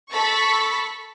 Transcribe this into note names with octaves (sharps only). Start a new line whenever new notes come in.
A4 B5 C#6 A6 B6